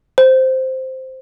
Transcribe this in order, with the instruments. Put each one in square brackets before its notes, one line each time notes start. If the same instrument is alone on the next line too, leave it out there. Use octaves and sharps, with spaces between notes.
[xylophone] C5